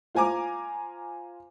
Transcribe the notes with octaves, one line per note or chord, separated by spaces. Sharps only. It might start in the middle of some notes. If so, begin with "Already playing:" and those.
F4 C5 G#5 A#5 D6